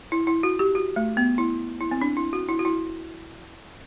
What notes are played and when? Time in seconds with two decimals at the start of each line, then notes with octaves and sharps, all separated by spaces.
0.12 E4
0.27 E4
0.43 F#4
0.59 G4
0.75 F#4
0.96 A3
1.17 B3
1.38 E4
1.81 E4
1.91 C4
2.01 D4
2.17 E4
2.33 F#4
2.49 E4
2.59 F#4
2.65 E4